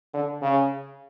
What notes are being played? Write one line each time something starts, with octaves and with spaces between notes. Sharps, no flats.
D3
C#3